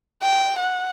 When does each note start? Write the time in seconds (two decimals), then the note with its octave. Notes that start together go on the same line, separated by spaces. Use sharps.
0.23 G5
0.60 F#5